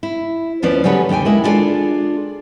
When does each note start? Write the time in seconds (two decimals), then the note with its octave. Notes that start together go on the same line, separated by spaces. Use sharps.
0.03 E4
0.62 D#2 F3 C#4 B4 D5
0.84 C#3 F#3 G3 C#4 A4 B4
1.09 D#2 D3 D#4 G5 G#5
1.25 G#3 E4 A#4
1.44 D4 E4 F4 G#4 A4 D5